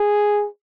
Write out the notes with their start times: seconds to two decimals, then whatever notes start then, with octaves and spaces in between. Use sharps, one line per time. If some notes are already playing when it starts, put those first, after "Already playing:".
Already playing: G#4